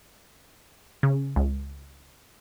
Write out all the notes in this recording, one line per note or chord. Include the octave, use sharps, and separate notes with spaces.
C#3
C#2